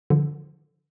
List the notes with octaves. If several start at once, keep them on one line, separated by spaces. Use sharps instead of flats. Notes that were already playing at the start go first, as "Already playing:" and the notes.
D3 F3